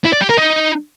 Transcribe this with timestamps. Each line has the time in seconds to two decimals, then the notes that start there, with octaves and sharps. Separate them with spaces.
0.05 E4
0.13 D5
0.21 G4
0.29 A#4
0.38 D#4